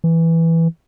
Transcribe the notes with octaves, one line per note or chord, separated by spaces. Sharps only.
E3